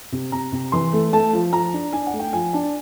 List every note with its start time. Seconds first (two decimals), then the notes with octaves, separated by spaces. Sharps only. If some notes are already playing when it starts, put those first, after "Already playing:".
0.12 C3
0.32 C3 A#5
0.52 C3
0.72 E3 C6
0.93 A3
1.13 A3 A5
1.33 F3
1.52 F3 A#5
1.74 D4
1.93 D4 G#5
2.07 F#5
2.13 A3
2.19 G5
2.33 F3 G#5
2.53 D4 A5